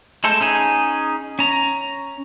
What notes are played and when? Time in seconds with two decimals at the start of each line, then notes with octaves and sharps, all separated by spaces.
0.24 G#3 A3 A4 C5
0.41 C#4 D#4 G#4
1.39 C#4 A#5